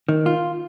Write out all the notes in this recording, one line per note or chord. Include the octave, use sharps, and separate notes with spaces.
D#3
F4